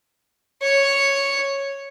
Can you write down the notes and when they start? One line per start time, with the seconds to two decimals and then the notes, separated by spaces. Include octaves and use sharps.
0.62 C#5